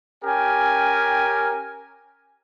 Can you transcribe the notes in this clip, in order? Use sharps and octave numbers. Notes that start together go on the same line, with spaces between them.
C#4 G4 A#4 G5 G#5